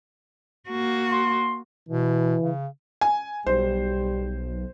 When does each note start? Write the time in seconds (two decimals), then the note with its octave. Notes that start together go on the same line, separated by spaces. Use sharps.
0.69 A#3 F#4
1.12 C6
1.89 B2 E3
2.42 C#3
3.01 G#5
3.47 B1 G3 C5